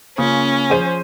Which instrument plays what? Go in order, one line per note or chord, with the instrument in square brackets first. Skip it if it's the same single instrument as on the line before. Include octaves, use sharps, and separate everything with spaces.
[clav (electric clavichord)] C#3 [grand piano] A#3 F4 [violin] C#4
[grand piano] F3 D#6 D#7 [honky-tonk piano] G#4 C5